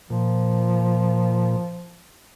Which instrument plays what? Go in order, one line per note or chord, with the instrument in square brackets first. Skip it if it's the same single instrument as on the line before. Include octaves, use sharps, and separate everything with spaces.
[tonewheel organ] A#2 [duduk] F3